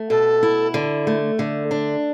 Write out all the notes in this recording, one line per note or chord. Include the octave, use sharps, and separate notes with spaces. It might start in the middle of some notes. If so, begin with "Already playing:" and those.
Already playing: A3
B2 A4
E4
D3
A3
D3
D4